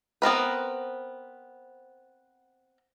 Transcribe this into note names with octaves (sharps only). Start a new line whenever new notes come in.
B3 C4 A#4 B4